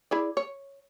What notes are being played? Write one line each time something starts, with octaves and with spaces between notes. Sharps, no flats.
E4 G#4 D5
C#5